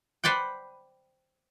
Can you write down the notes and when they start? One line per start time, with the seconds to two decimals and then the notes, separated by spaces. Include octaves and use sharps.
0.24 B4 C5 D5 F#5 G5